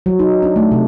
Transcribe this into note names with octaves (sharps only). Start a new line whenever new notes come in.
F#3
D#4
D4
A3
C3